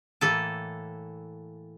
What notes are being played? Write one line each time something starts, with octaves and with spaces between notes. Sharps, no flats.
A2 E3 A#3 A4 A5